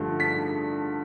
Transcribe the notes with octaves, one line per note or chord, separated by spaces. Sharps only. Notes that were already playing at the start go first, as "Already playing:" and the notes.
Already playing: G2 D3 F3 A3
B6